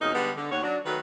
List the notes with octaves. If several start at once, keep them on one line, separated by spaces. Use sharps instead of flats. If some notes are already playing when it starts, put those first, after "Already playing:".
F2 B2 G#3 A#3 C#4 D#4
D3 G3 G#3 B3
D3
D#2 C#5 F#5
F#3 D4
D#3 F#3 A3 B4